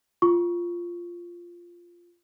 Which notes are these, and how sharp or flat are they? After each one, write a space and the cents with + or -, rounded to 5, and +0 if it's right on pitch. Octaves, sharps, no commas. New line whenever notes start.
F4 -5 C#6 +10